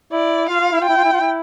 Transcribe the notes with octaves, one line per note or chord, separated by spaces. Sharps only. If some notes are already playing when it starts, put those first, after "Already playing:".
E4 D5
F4 F5
F4
E4
F4
E4 G5
F4
E4
F4
E4